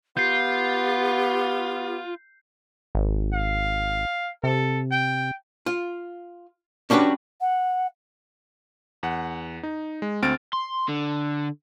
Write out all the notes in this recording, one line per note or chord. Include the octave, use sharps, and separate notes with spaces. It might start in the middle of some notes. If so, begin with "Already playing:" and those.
B3 F4 G4 G6 C7
G#1
F5
C3 A4
G5
F4
C#4 D4 F#4 G4 B4
F#5
E2 F#5
D#4
G#3
D2 C4 F6 A6 D7
C6
D3